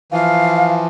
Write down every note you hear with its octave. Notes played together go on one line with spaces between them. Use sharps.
E3 F3 F5